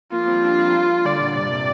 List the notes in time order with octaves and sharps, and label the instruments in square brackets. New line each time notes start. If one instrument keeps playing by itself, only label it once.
[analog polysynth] F3 A#3 [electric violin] F4
[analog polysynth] G3 C4
A#3 D4
G3 C4
[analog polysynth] D3 G3 [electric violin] D5
[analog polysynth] A#2 D3
[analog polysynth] G2 C3 [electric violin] D5
[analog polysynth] A#2